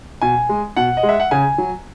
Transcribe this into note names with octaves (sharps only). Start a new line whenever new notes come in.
B2 G#5
G#3
B2 F#5
D#5
G#3
E5
F#5
C#3 G#5
F#3